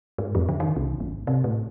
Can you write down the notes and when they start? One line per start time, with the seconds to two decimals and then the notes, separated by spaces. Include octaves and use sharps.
0.18 G#2
0.35 F2
0.49 D3
0.60 D#3
0.76 C2
1.00 G#1
1.27 C3
1.44 A2